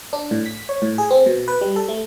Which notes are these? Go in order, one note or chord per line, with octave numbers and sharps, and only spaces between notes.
D4
A2
B6
C#5
A2
G#4
C4
B2
B4
G3
A4
A3